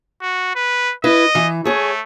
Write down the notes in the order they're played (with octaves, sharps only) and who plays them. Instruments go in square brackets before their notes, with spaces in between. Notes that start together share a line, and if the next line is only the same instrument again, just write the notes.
[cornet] F#4
B4
[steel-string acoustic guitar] E4 B4 [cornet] D#5
[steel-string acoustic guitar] E3
[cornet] A3 [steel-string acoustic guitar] G#4 C#5